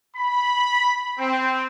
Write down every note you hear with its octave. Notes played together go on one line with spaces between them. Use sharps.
B5
C4